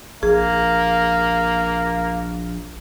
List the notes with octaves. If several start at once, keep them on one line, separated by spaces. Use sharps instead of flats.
A#1 A#3 G#4